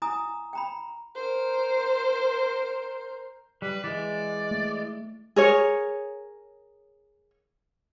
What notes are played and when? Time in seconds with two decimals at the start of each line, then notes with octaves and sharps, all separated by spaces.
0.02 E4 G#5 A#5 D#6
0.53 G5 A#5 B5
1.15 A#4 C5
3.62 G3 B4
3.84 E3 G#3 D5
4.51 A3
5.36 G#4 A#4 C#5